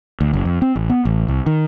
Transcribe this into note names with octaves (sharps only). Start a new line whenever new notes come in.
D2
F#1
F2
C4
A1
B3
A1
C2
D#3